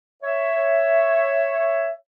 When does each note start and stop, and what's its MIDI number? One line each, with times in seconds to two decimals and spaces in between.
0.23 1.93 73
0.23 1.93 76